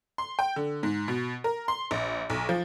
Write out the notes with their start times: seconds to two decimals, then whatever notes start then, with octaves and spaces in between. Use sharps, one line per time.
0.18 C6
0.39 G5
0.56 D3
0.83 G#2
1.08 B2
1.44 A#4
1.68 C6
1.91 A#1
2.30 B1
2.49 F3